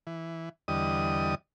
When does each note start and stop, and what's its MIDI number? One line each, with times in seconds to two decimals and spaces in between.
0.07 0.49 52
0.68 1.35 40
0.68 1.35 50
0.68 1.35 55
0.68 1.35 75
0.68 1.35 87